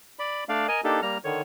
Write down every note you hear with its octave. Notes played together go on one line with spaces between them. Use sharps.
D5 B5
A3 D4 D5 F5
A#4 D#5 G#5
A#3 D4 D#4 G4 A4
G3 A#3 A#5 F6
D3 D#3 C#5